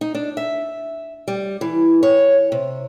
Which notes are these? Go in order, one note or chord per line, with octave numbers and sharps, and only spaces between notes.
D#4
D4
E5
G3
E3
C#5
C3